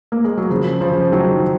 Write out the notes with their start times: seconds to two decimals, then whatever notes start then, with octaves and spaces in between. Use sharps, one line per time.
0.12 A#3
0.24 G#3
0.37 F#3
0.50 C#3 F3
0.81 C#3 F3
1.12 D#3 F#3